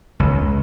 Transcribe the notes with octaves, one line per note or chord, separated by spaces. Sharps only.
C#2